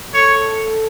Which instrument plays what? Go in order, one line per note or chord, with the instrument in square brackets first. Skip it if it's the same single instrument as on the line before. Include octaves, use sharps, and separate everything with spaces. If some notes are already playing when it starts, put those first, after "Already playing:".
[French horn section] A4 [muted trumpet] C#5